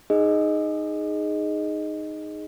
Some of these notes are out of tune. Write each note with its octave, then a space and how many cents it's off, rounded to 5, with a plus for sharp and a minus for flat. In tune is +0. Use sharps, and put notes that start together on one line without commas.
D#4 -5 G#4 +0 D#5 +0